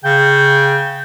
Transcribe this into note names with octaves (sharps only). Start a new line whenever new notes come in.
C#3 G5